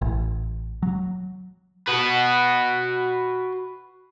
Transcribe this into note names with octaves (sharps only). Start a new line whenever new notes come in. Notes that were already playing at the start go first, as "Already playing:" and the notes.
A1
F#3
F#4 B4